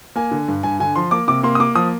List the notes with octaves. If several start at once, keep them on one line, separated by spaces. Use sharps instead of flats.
A#3 G#5
D3
G2
G2 G#5
D3 G#5
F3 C6
A#3 D6
C3 D6
A#3 C6
D#6
A#3 D6
F3 D#6